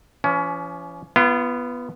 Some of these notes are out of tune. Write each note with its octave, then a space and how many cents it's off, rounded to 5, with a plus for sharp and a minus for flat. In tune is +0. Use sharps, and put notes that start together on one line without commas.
F3 -45 C#4 +25
B3 +0 F4 -35